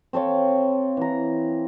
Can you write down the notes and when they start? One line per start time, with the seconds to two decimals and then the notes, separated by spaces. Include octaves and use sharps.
0.13 C4 A4 C#5 F5
0.97 E3 A#5